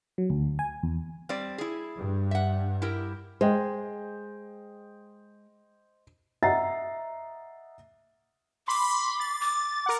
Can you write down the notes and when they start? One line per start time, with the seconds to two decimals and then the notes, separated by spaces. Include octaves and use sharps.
0.18 F#3
0.30 D2
0.59 G#5
0.83 E2
1.29 G3 C4 D5
1.58 E4 G#4
1.97 G2
2.31 E5 F#5
2.82 E4 G4 A#4
3.41 G#3 C5 D#5 G5
6.43 D#5 E5 F#5 A#5 A6 C7
8.68 B5 C6 D6
9.20 A6
9.41 D6
9.86 A#4 F#5